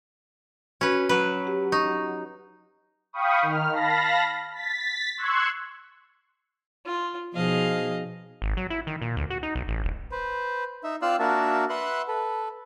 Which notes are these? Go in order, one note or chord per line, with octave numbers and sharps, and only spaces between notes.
C#4 F#4 B4
F#3 B4
G4
D#4 C#6
F5 G5 B5 C#6 D#6
D#3 F6
F5 A5 B5 A#6
A6 B6
C6 C#6 E6 F#6 G#6
F4
B2 F3 D#4 G#4 D#5 F5
G#1
F#3
E4
D#3
A#2
D2
F#4
D#4
B1
A1
D1
B4 C5
D#4 E5
C4 F4 D5 F5 E6 F#6
A#3 D4 F#4 A#4 E5 A5
B4 E5 F#5 C6 F#6
A4 B4